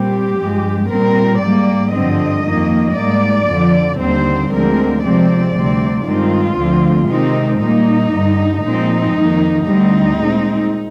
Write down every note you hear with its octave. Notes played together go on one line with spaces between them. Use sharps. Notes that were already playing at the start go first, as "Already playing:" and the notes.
Already playing: A#2 G3 C4 G4
G2 F3 G#3
A#2 G3 C4 A#4
G#2 G3 A#3 D5
G2 D3 F3 C4 D#5
F2 D#3 A#3
G#2 G3 A#3 D5
F2 D3 F3
D#2 D3 G3 C4 C5
D2 D3 F3 G#3 C4 A#4
C3 F3 G#3 C4 D5
D2 C3 G3 C4
G2 D#3 G#3 C4 F4
D2 D3 F3 C4
C3 D#3 G#3 C4 D#4
A#2 G3 A#3 D#4
G2 D3 G3
A#2 F3 G#3 C4 D#4
F2 D#3 A#3
D2 D3 G3 C4 D#4
A#2 G#3 C4